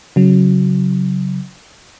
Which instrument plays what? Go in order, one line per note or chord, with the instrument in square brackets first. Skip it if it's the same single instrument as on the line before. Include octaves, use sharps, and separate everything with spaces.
[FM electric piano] C#3 F#3